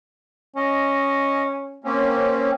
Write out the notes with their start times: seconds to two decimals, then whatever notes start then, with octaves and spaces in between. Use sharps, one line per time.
0.56 C#4 D#5
1.84 A#3 C4 C#4